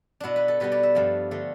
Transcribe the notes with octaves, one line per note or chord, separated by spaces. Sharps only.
B2 B3 D4 E4
B4
A4
B2 G3 B3 B4
D5
E5
G2 F3 A3
D3 A3